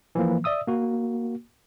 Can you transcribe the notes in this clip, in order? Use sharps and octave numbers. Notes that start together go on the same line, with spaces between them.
E3 F3 A#3
D5 E5 D#6 E6
A#3 F#4